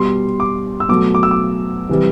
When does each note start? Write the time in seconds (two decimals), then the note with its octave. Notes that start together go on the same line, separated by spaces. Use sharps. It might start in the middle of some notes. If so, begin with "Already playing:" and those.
Already playing: B2 G3 C6
0.40 D6
0.80 E6
0.89 B2 F#3 A3 D6
1.14 D6
1.23 E6
1.31 D6
1.89 C3 E3 G3